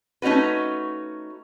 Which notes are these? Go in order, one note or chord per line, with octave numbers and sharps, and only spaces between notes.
A3 C#4 D#4 F#4 B4